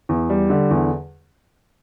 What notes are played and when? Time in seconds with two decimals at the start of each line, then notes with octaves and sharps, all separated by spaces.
0.09 E2
0.30 G3
0.50 D3
0.71 E2